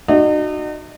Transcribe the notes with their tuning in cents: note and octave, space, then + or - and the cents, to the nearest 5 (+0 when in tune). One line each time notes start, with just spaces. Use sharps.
D#4 -40 F#4 +0 E5 -40